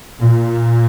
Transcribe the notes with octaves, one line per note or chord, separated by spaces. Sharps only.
A#2